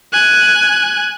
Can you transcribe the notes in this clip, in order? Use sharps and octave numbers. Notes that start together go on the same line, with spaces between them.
G#5 F#6